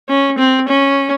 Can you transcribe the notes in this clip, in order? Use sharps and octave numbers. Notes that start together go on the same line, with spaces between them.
C#4
C4
C#4